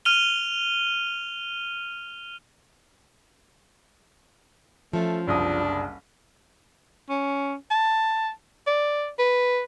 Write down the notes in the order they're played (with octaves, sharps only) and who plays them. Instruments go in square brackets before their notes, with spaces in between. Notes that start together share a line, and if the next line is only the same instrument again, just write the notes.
[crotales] F6 D#7 F7 G7
[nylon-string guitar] F3 C#4 [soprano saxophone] A3
[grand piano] F#1 C2 D#6 [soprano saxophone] D4
[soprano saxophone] C#4
A5
D5
B4